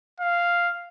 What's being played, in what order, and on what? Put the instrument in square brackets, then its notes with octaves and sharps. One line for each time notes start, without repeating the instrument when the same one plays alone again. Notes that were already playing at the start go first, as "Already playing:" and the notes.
[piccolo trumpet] F5